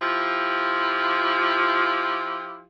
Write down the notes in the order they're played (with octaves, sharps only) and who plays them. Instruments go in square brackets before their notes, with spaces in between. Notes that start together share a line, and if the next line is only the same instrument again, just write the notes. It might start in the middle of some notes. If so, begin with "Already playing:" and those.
[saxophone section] F3 E4 F4 G4